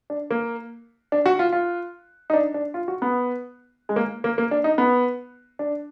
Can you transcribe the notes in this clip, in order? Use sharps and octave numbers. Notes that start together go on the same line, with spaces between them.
D4
A#3
D4
F#4
F4
F4
D#4
D4
D4
F4
F#4
B3
G#3
A#3
A#3
A#3
D4
D#4
B3
D4